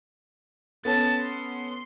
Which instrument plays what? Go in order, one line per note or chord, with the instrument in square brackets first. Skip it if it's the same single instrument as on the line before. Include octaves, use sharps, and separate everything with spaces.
[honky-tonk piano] B3 C#4 A4 [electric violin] A5 A6
[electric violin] C6